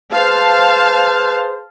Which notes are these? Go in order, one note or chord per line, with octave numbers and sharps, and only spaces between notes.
G#4 B4 C5 F5 A5